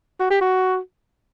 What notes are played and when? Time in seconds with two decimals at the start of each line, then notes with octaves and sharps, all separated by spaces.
0.20 F#4
0.31 G4
0.41 F#4